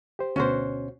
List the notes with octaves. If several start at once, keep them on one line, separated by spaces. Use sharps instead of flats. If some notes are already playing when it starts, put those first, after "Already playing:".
G4 C5
D2 B2 C#4 F#4 C5